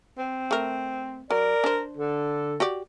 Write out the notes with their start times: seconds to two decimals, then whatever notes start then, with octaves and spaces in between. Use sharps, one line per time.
0.18 C4
0.51 A3 A#4
1.30 F#3 A#4 D5
1.64 D4 C5
1.97 D3 A4
2.60 F#4 G4 D5